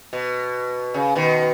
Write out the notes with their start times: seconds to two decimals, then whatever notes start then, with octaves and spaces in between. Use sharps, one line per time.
0.13 B2
0.94 C#3
1.15 B2 D#3